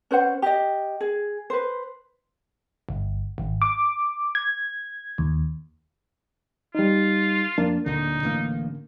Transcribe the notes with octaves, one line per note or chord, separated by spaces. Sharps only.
C#4 B4 C5 F#5
G4 D#5
G#4
B4 C5
G1
G#1
D6
G#6
D#2
G3 D#4 F4
F2 A#3 D4
D1 A#2 D3 D#4
A1 A2 A#3